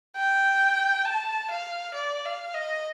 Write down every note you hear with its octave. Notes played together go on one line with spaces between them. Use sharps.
G5
A5
F5
D5
F5
D#5